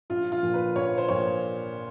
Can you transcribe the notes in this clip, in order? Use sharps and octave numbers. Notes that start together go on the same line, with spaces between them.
A#1 F4
F4
A#2 F3
B4
A#1 C#5
C5
A#2 F3 C#5